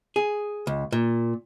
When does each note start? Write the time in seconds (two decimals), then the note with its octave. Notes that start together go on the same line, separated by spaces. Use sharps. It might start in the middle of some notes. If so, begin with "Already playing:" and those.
0.16 G#4
0.67 C#2
0.92 A#2